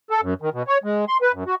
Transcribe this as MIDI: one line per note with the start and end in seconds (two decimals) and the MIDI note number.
0.10 0.21 69
0.22 0.34 42
0.42 0.50 51
0.53 0.63 47
0.68 0.78 73
0.84 1.05 56
1.08 1.17 84
1.22 1.32 71
1.33 1.44 42
1.46 1.55 66